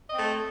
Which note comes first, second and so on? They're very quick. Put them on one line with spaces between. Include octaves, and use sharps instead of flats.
D#5 C4 A3